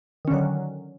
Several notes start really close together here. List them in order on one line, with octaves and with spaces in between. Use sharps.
D#3 C#4 D3 F#3